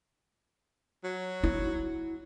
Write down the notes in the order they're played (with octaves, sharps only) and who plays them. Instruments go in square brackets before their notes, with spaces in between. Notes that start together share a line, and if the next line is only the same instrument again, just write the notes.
[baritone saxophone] F#3
[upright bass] E4